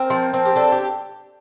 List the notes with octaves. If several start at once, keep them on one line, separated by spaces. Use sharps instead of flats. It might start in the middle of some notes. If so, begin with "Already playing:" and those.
Already playing: C4 A#4
F3
C4
G4
D4 A4
G4